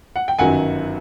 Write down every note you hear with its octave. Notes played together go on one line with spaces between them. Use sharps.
F#5
G5
G1 F#2 D#3 F#3 F#5 G#5